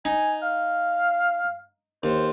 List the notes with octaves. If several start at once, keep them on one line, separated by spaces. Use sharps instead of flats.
D#4 G#5
F5
D#2 C5